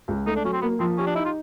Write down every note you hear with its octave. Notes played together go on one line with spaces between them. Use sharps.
C#2
A3 D#4
D4
F#3 C#4
C4
A#3 B3
F3 C4
C#4 G4
D4
D#4 E4
F4